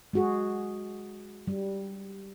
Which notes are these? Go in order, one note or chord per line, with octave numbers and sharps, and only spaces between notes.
G#3 F#4 G#4
G3